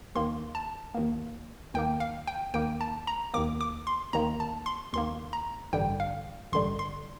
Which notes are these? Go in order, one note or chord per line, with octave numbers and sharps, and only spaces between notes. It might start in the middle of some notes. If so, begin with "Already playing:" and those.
D#2 D#3 A#3 C6
A5
D#2 D#3 A#3
D#2 D#3 A#3 G5
F5
G5
D#2 D#3 A#3 G5
A5
A#5
D#2 D#3 A#3 D6
D6
C6
D#2 D#3 A#3 A#5
A5
C6
D#2 D#3 A#3 C6
A#5
A1 G2 D3 G3 G5
F5
A1 G2 D3 G3 C6
C6